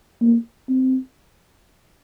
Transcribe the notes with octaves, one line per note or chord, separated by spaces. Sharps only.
A#3
C4